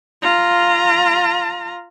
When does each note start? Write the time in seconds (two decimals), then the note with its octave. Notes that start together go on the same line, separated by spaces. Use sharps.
0.22 F4 A#5